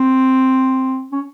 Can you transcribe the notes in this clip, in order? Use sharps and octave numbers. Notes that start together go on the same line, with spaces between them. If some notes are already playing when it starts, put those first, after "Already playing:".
Already playing: C4
C#4